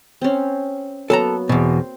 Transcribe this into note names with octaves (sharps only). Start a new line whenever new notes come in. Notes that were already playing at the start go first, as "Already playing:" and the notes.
C4 C#4
F#3 A#3 B3 A4 A5 A#5
E2 B2 C4